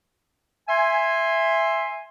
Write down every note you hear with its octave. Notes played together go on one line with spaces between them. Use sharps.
E5 G#5 C6